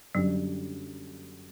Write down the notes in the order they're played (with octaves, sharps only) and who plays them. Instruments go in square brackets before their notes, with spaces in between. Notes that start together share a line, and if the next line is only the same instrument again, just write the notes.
[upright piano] F#2 D3 G3 [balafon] F#3